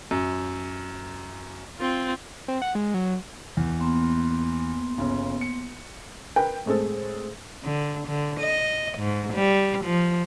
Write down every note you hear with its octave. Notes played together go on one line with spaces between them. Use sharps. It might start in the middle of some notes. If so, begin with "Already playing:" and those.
F#2
C4 F4
C4
F#5
G#3
F#3
E2
A#3 B3 C6
G1 C#3
C#7
A#4 B4 G5
A2 G#3 C4 A4
D3
D3
D#5
G#2
G3
F3